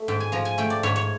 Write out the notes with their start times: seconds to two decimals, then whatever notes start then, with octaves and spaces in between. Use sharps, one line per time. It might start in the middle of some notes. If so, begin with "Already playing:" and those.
Already playing: A3 E5
0.08 G#2 G5
0.20 G#5
0.32 F3 A#5
0.45 G#5
0.58 A3 G5
0.70 D5
0.83 G#2 C#5
0.96 C#5